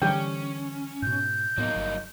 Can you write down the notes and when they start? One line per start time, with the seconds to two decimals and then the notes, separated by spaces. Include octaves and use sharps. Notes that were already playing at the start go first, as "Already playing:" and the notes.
0.02 D3 E3 G3 C#4 G4 G5
1.02 G#2 B2 G6
1.58 A2 F#3 A#3 B3 D#4
1.76 G1